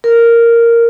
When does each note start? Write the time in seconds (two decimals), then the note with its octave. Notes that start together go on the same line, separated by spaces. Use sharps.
0.04 A#4